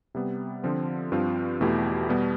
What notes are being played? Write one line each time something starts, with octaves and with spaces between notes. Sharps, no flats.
C3 G3 B3
D3 F3 C4 F4
G2 F3 C4 F4
E2 B2 A3 E4 G4
B2 G3 B3